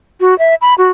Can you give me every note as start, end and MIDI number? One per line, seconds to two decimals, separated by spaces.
0.20 0.37 66
0.39 0.55 76
0.61 0.74 83
0.78 0.91 66